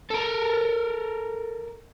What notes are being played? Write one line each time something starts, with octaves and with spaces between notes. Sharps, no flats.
A4 A#4